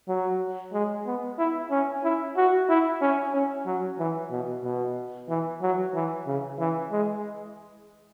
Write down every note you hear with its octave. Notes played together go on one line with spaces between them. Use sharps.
F#3
G#3
B3
E4
C#4
E4
F#4
E4
C#4
C#4
F#3
E3
B2
B2
E3
F#3
E3
C#3
E3
G#3